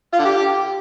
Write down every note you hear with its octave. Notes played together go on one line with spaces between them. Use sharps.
F4
D3
G4